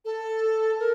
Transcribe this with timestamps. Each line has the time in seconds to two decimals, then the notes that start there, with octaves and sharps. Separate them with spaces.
0.05 A4
0.79 A#4